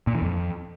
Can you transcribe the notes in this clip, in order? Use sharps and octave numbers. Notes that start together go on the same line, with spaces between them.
A#2
E3
F2